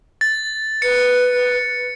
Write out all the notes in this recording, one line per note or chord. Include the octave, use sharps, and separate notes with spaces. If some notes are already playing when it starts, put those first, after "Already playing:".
A6
B4 C#7